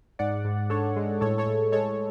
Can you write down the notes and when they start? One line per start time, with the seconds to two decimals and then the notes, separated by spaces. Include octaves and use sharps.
0.19 G#2 D5 F#5
0.45 G#2
0.70 D4 A4 C#5
0.96 G#3
1.21 A2 A4 C#5
1.38 A4 C#5
1.47 A2
1.72 G#3 A4 C#5